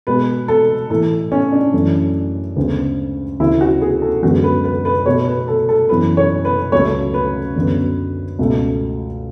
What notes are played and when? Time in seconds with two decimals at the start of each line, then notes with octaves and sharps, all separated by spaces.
0.07 B2 G#3 B3 B4
0.48 A4
0.90 A2 E3 A3 A4
1.32 C#4
1.52 D4
1.74 F#2 E3 A3
2.56 D2 C#3 G#3 B3
3.40 D2 C#3 F#3 E4
3.61 F#4
3.82 G#4
4.02 A4
4.22 F#2 D3 G#3 B3 F#4
4.44 B4
4.64 B4
4.85 B4
5.06 B2 A3 C#5
5.27 B4
5.48 A4
5.69 A4
5.89 F#2 E3 B3 B4
6.17 C#5
6.45 B4
6.72 C#2 C#3 F#3 A3 C#5
7.14 B4
7.56 F#2 D3 F#3 B3
8.39 C#2 B2 A3